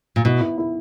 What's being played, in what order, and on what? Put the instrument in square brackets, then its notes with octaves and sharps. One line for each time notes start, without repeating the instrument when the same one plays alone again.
[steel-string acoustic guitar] A#2
[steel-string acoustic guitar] B2 [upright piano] E4
[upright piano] E4
E4